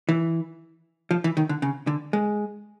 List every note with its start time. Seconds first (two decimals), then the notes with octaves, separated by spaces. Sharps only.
0.09 E3
1.11 F3
1.24 E3
1.37 D#3
1.49 D3
1.62 C#3
1.87 D3
2.13 G#3